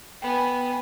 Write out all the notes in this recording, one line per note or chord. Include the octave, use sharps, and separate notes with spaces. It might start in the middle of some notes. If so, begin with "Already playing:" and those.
B3 G5 G#5 B5